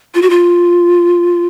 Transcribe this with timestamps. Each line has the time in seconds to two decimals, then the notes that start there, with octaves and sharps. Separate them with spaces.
0.15 F4
0.22 F#4
0.30 F4